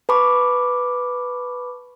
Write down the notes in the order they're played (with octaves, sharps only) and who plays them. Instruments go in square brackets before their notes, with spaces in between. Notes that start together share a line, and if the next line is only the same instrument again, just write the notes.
[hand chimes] B4 A5 B5 C#6 D6